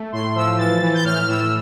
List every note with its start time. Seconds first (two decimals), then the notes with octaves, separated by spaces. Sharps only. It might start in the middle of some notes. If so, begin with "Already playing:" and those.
Already playing: A3
0.12 A2 C6
0.35 F3 E6
0.58 E3 A6
0.82 E3
0.94 G6
1.05 A2 F6
1.28 A2 E6